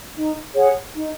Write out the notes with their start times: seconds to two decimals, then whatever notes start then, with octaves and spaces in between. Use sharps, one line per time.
0.15 D#4
0.54 G#4 C#5 F#5
0.94 D#4